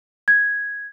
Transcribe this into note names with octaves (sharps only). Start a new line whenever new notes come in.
G#6